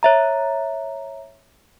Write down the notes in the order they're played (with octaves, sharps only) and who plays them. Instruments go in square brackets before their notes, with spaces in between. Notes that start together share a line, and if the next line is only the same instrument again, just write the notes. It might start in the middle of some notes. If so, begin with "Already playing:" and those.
[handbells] C#5 E5 A#5